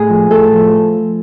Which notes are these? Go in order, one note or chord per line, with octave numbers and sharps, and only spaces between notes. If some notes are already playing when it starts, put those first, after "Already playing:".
Already playing: A2 G#4
F3
A2 A4
F3